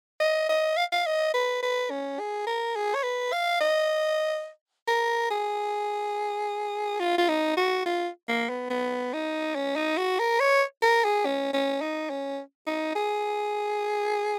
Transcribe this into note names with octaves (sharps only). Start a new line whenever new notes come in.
D#5
D#5
F5
F5
D#5
B4
B4
C#4
G#4
A#4
G#4
C#5
B4
F5
D#5
A#4
G#4
F4
F4
D#4
F#4
F4
A#3
B3
B3
D#4
C#4
D#4
F#4
A#4
C#5
A#4
G#4
C#4
C#4
D#4
C#4
D#4
G#4